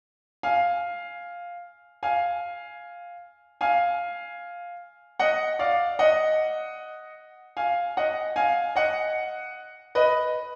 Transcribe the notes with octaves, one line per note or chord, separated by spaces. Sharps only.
F5 G#5
F5 G#5
F5 G#5
D#5 F#5
D5 F5
D#5 F#5
F5 G#5
D#5 F#5
F5 G#5
D#5 F#5
B4 D#5